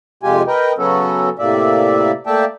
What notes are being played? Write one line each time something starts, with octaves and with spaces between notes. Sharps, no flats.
F2 C3 G#3 F4 G4 G#5
A#4 B4 D#5 G5
C#3 F#3 B3 C#4 F#4 A4
A2 C3 A#3 D5 E5
A3 A#3 D5 E5 G5 A5